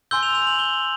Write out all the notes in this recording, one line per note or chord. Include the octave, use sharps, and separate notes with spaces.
G#5 C6 E6 G6 G7
F7
F7
F#7
G7